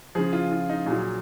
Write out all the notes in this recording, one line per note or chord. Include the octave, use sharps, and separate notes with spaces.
C#3 F3 G#4
F4
F4
D#4
A#2 F#3 G#4